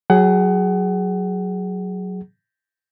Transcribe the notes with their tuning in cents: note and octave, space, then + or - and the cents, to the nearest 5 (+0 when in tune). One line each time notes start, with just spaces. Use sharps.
F#3 +0 G#4 +0 F#5 +30